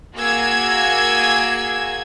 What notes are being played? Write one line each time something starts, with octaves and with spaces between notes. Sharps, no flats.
A#3 F#4 G#4 E6 G#6